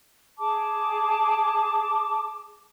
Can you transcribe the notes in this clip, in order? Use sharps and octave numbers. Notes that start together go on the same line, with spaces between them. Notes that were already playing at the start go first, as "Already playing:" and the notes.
G#4 A5 D6